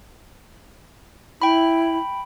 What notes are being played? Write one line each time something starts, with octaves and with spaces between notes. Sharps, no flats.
E4 G5 B5